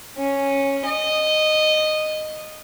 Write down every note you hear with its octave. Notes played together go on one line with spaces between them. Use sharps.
C#4
D#5